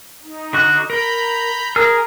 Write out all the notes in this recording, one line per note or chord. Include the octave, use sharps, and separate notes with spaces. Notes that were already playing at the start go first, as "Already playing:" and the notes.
D#4
D3 F#4 F#6
A#4 A#5 B5 G6
G#4 A#4 E6 F6